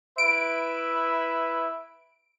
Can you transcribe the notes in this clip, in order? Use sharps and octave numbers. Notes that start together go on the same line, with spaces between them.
E4 B4 E5 D7